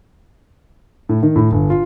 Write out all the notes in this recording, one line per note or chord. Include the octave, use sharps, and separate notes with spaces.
A2
D#3
A2
G1
F4